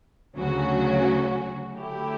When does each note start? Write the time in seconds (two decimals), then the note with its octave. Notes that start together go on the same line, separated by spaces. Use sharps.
0.36 D2 C#3 F#3 C#4 F#4
1.76 D3 F#3 A3 E4 G4